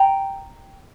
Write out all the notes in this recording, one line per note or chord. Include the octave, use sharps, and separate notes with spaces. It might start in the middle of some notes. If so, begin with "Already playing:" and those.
Already playing: G5 A#5